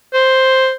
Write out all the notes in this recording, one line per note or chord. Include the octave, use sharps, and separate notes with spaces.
C5